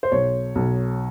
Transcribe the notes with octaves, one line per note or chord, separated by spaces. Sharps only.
C5
B1 C#5
B1